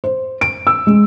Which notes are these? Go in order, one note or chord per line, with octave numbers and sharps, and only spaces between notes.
C5
D7
E6
G#3